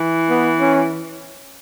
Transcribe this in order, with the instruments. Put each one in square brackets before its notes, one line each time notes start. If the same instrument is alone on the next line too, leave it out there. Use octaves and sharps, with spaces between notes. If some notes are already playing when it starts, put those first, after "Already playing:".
Already playing: [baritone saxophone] E3
[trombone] B3
C#4